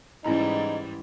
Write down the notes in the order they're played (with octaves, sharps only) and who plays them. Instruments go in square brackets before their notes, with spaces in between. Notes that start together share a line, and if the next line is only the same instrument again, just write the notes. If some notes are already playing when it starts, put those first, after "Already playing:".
[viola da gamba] G#2 E3 G3 [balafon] C#4 E4 A#5 [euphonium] D#4